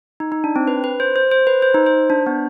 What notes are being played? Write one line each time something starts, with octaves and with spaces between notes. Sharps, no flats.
D#4
D#4
D4
C4
B4
B4
C5
C5
C5
B4
C5
D#4
C5
D4
B3